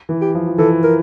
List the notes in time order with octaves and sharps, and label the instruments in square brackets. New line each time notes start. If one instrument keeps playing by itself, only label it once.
[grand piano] E3
[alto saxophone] G4
[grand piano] F3
F3
[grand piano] E3 [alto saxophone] A4
[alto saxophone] A#4